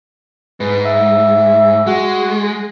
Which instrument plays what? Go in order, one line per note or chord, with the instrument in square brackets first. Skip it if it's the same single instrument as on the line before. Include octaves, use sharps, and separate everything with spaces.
[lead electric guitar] G#2 [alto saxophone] B4
[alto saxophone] E5
[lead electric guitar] G#3 [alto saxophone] F#4